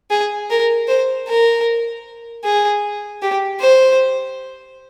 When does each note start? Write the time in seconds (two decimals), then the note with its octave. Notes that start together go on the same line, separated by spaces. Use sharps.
0.11 G#4
0.50 A#4
0.88 C5
1.28 A#4
2.44 G#4
3.22 G4
3.60 C5